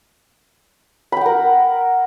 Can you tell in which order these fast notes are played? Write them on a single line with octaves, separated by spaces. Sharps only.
B5 G5 F#5 A#4